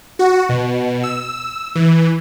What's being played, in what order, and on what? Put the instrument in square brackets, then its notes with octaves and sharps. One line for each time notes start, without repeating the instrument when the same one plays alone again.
[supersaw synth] F#4
B2
E6
E3